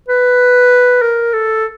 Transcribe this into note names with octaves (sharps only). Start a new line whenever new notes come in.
B4
A#4
A4